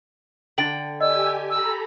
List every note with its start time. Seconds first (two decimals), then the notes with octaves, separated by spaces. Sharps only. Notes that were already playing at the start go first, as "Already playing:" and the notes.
0.58 D3 G5 A6 D7 F#7
1.01 G4 D5 D#5 G#5 E6
1.50 A4 A#5 B5 E6